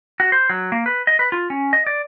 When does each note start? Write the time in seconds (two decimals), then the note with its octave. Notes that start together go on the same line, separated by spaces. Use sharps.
0.20 F#4
0.32 C5
0.50 F#3
0.72 A#3
0.86 B4
1.07 D#5
1.19 B4
1.32 F4
1.50 C#4
1.73 D#5
1.87 D5